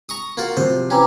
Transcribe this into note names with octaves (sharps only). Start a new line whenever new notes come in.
A#5 C#6 D#6
A#3 F4 F#4
C3 F3 F#3 C5
E3 C#4 G5 A#5 D6